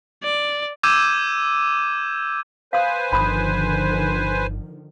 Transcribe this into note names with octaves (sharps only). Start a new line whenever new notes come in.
D5
D6 E6 G6 G#6 D#7 E7
B4 C5 F5 G#5 D#6
G1 D3 D#3 F3 B5 D#6